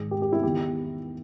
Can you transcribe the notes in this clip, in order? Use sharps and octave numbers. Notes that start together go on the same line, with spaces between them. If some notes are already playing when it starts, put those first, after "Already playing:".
Already playing: G#2 D#3 G#4
G4
G4
E4
E2 D#3 G4